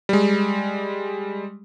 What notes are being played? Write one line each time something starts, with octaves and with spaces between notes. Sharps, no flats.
G3 G#3